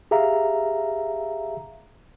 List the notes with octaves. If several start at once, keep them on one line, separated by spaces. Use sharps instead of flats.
G4 G#4 E5 F5 A#5